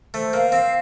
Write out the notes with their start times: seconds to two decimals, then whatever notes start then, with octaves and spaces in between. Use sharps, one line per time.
0.14 A3 C5
0.33 A#3 F5
0.52 C4 F5